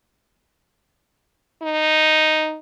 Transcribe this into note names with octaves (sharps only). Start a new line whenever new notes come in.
D#4